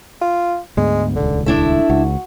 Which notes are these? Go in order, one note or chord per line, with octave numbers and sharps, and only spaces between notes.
F4
D2 G#2 G#3 B3
D#1 C#2 D3
A3 D4 E4 E5
C#2 F#4